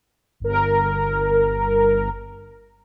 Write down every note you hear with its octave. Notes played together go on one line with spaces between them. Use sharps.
G1 A#4